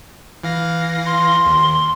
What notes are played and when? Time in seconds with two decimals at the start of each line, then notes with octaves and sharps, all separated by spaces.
0.43 E3 F5 A#6
1.06 C6
1.46 D#2